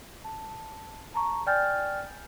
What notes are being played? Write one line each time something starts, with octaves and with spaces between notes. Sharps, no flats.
A5
A5 A#5 C#6
D5 G5 G#5 F6 G6 A6